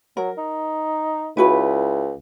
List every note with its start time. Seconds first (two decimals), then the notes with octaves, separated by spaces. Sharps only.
0.17 F#3 A#4
0.38 D#4
1.37 C#2 E4 F#4 B4